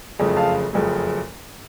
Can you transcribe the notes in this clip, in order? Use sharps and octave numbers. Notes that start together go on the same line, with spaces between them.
F#1 F2 C#3 A3
F5 A5
F#1 F2 C#3 A3